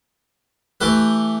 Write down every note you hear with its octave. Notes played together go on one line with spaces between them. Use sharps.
E3 A3 G4 B4